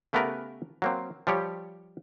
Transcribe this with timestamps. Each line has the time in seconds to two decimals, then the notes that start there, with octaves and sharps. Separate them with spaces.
0.13 C#3 A3 B3 G4 A#4 B4
0.82 F#3 A#3 C4
1.27 F3 G3 G4 C#5